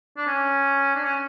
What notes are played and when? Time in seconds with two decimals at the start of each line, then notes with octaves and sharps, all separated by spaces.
0.17 D4
0.27 C#4
0.96 D4
1.04 C#4